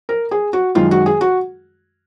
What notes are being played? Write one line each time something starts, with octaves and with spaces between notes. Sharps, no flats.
A#4
G#4
F#4
F#2 D#3 G#3 F4
F#4
G#4
F#4